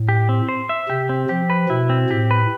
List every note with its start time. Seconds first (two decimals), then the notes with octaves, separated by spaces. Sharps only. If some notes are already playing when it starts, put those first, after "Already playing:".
Already playing: A2
0.09 G4
0.29 C4
0.49 C5
0.69 E5
0.89 C3 G4
1.09 C4
1.29 F3 G4
1.50 B4
1.69 B2 E4
1.90 C4
2.10 A2 G4
2.31 B4